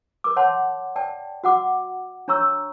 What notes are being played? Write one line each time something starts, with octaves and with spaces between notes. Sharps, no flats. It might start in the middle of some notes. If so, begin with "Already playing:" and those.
A#4 D6
C#5 F#5 A5 C6
D5 G5 A5
F#4 F#5 D6
D4 C#5 A#5 C#6 E6